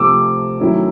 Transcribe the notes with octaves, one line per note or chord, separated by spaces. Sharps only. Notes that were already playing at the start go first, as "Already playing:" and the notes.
Already playing: C3 F3 A3 C4 D6 E6
D#3 F#3 A3 C#4 E4